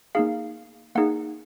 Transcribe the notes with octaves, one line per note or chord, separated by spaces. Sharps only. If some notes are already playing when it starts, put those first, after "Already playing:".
A#3 D#4 G#4 F5
A#3 D#4 G#4 F#5